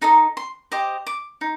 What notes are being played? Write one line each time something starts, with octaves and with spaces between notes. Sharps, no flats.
D#4 A4 D#5 A#5
C6
G4 C5 D#5 D6
D6
D#4